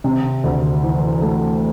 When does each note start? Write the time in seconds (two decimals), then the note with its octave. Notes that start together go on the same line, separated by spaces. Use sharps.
0.04 C3
0.44 D2
0.83 E3
1.22 A3